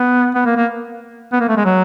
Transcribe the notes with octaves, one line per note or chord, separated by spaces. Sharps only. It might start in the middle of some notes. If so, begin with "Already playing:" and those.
Already playing: B3
B3
A#3
A#3
B3
A#3
A3
G#3
F#3